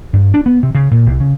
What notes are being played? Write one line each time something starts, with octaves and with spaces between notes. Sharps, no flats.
G2
D4
B3
C3
C#3
A#2
C2
C#3